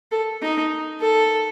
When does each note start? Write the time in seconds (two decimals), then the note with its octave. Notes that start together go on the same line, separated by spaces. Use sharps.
0.11 A4
0.42 D#4
1.00 A4